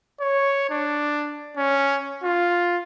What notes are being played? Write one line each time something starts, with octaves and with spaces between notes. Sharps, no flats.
C#5
D4
C#4
F4